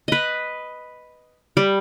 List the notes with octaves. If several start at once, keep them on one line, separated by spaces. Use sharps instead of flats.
B4 D#5
G3